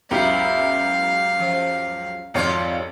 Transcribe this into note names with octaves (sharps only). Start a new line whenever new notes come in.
C#2 F#2 B3 E4 G4 F5
F3
G#1 F2 F4 G4 C#5